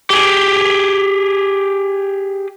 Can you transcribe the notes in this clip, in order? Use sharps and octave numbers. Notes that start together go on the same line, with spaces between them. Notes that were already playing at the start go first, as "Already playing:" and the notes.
G4 G#4